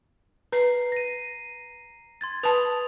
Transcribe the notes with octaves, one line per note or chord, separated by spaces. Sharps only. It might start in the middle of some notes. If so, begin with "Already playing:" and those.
B4 A#5 C7
A#6 D#7
C6 G#6 A6
B4 A5 B5 D#6 F7